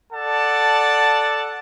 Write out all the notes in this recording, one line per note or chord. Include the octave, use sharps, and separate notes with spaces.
A4 D5 F#5 A5